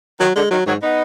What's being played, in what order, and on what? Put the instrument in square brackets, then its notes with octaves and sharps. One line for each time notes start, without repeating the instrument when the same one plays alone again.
[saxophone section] D#3 [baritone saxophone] F#3
[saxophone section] D3 [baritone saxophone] G#3
[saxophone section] D#3 [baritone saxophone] F#3
[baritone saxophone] G#2 [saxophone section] D#3 F#3
[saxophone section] B3 D#4